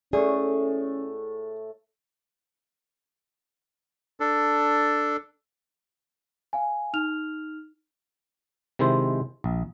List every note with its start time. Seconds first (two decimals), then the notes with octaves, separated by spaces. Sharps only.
0.13 A2 A3 C#4 G4 G#4 D5
4.20 D4 A4
6.53 F5 G#5
6.94 D#4 F6 F7
8.79 C3 D#3 G#3 E4 C5
9.44 A#1